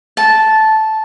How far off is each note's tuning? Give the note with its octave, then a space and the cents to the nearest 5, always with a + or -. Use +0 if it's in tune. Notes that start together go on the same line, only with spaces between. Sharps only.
A5 -10